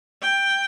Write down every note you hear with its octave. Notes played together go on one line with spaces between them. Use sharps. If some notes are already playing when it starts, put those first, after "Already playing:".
G5